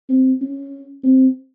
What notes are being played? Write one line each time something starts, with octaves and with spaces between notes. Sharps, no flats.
C4
C#4
C4